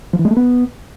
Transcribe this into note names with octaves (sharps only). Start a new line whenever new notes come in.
F3
E3
G#3
A3
B3